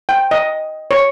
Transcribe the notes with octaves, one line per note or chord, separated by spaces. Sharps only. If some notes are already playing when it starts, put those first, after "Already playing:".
G5
D#5
C#5